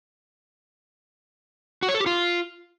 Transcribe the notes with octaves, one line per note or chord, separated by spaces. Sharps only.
F#4
C#5
A4
G4
F4